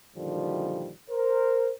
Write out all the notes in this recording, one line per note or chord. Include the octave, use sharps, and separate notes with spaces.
F#2 A#2 D3 D#3 F3 G3
A#4 C5